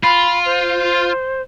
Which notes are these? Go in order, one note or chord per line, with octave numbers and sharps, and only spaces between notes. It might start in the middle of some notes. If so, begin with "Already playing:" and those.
F4 B5
C5